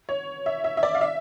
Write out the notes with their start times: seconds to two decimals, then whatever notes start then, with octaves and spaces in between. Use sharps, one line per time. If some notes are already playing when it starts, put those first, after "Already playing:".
0.09 C#5
0.46 E5
0.64 E5
0.77 E5
0.83 D5
0.95 F5
1.01 E5